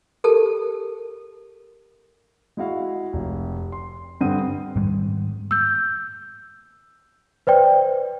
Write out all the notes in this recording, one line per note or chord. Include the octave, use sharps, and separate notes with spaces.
G4 A4 A#4 A5
G#3 E4 F#4 F5
F1
C6
G2 D3 C4 F#5 D#6 D#7
G#2 D#3 G3 G#3
E6 G6
B4 C5 D5 G5